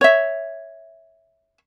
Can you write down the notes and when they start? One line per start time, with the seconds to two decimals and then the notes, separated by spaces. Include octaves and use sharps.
0.01 C#5 E5